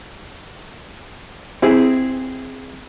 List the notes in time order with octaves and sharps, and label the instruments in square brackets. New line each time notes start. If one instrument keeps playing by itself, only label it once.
[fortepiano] C4 E4 G#4